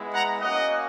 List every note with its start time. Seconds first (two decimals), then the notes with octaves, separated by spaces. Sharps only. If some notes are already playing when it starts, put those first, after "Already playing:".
Already playing: G#3 B3 E4
0.13 F#5 A#5
0.41 A#3 C#4 F#4 D#5 F#5